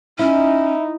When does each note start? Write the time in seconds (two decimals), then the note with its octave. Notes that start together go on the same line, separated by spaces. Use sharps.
0.19 C#4 D#4 E4